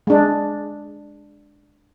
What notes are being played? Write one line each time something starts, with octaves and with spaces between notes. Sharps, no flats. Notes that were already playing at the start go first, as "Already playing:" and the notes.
G#3 D4